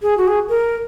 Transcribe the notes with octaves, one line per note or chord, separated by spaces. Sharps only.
G#4
F#4
G#4
A#4